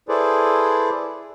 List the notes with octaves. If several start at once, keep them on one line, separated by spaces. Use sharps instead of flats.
E4 G#4 A4 B4 C5 D5